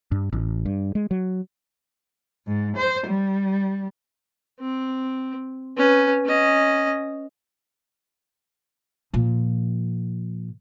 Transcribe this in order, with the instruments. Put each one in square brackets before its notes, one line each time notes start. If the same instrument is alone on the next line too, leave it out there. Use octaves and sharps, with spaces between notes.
[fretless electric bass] G2
A1
G2
G#3
F#3
[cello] G#2
C5
G3
[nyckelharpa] C4
C#4 B4
C#4 D#5
[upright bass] A#2 F3